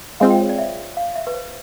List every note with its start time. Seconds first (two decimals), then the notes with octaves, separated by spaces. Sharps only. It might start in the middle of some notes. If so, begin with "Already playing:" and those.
0.20 G#3 C4 F4 F5
0.30 G5
0.40 C#5
0.49 D5
0.58 E5
0.97 F5
1.15 E5
1.27 B4
1.34 C5